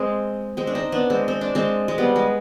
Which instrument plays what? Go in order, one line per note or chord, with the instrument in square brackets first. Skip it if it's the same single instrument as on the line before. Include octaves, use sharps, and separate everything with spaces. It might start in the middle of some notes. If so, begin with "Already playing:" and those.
Already playing: [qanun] G#3 C4
G#3 C4
D4
C4 D#4
B3 D4
G#3 C4
C4
D4
G#3 C4
G#3
G3 B3
G#3